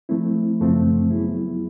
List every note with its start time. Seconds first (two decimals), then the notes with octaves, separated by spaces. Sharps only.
0.09 F3 A3 C4 E4
0.60 F#2 C#3 F3 A3 C4
1.11 F#3 B3 E4 G#4